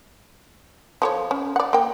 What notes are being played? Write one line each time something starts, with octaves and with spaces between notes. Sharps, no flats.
F3 A4 C#5
C#4
D5 F#5
A#3 G5